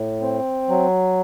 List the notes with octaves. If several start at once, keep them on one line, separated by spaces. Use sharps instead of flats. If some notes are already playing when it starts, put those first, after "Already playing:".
Already playing: A2
C4
F#3